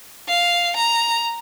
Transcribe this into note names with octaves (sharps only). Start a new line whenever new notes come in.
F5
A#5